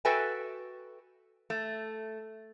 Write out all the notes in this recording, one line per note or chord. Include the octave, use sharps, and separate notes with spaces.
F#4 A4 B4 E5 G5 G#5
A3